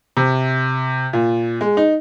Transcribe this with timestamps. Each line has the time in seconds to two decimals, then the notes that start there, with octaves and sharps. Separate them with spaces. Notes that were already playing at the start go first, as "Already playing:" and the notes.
0.17 C3
1.13 A#2
1.61 G#3
1.77 D#4